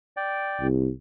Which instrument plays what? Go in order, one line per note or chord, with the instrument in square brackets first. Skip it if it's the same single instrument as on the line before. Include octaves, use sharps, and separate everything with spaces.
[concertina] D5 G5
[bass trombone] C2